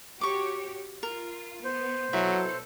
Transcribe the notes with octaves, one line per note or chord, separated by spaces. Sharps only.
F#4 G4 C#5 C#6 D6
F4 A#4
B3 C5
B2 F#3 E4 A4